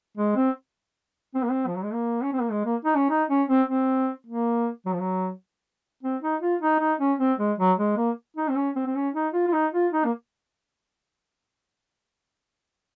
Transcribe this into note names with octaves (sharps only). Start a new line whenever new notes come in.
G#3
C4
C4
A#3
C4
F3
F#3
G#3
A#3
C#4
C4
A#3
G#3
A#3
D#4
C#4
D#4
C#4
C4
C4
A#3
F#3
F3
F#3
C4
D#4
F4
D#4
D#4
C#4
C4
G#3
F#3
G#3
A#3
D#4
C4
C#4
C4
C4
C#4
D#4
F4
F4
D#4
F4
D#4
A#3